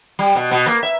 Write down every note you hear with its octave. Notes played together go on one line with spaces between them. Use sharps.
G3
B2
B2
A#3
E5